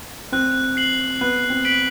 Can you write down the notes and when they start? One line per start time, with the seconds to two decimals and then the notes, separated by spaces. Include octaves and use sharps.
0.32 C4 F#6
0.77 C7 F#7
1.21 B3 F#6
1.50 C4
1.65 B6 D7 F#7